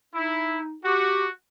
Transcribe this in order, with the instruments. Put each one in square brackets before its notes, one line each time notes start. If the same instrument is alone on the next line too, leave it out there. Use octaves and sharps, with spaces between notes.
[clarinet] D#4 [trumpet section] E4
[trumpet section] F#4 [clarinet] G4